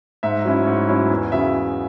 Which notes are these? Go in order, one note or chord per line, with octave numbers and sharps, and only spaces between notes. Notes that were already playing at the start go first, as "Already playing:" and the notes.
G#2 E5
F#3 C#4 E4
G#2
F#3 C#4 E4
E2
C#3 F#3 E5